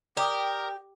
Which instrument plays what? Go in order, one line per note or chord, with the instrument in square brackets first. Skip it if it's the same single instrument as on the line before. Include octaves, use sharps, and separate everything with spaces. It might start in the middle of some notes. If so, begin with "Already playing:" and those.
[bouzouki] G4 [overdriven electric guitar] A#4 [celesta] D5 D6 D#6 [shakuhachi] G5